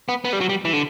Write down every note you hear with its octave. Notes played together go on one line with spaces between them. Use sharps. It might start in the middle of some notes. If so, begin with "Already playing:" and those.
B3
B3
G3
F#3
G3
E3
D3